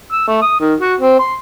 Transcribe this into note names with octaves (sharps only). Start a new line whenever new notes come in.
E6
A3
D#6
D#3
F#4
C4
C6